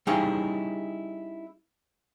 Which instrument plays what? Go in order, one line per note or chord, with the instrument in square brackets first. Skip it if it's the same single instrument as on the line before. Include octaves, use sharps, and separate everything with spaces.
[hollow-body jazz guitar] G3 C#4 D#4 E4 G#4 F5